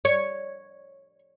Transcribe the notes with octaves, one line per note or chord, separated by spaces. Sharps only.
C#5